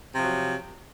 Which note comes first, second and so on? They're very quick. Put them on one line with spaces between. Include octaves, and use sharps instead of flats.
C3 F3 F#3